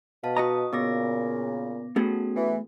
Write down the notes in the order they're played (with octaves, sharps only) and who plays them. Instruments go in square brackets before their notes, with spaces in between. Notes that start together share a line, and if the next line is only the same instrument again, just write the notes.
[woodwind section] B2 [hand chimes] F5 A5
[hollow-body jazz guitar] F#4 D#5 A#5 [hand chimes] D#6
[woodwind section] A#2 C#3 [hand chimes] B3 D6 A#6
[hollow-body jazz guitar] A3 B3 G#4 [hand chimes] C#4 F#4 A4
[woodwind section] E3